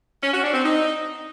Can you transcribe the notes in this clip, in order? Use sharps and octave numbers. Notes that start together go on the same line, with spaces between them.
C#4
F#4
D4
C4
D#4